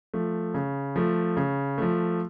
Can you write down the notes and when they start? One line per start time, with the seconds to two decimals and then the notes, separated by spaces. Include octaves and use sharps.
0.14 F3 A3
0.54 C#3
0.96 F3 A3
1.37 C#3
1.78 F3 A3